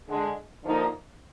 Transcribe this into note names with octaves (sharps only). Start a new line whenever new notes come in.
D3 G#3 D4
D3 F3 A#3 D#4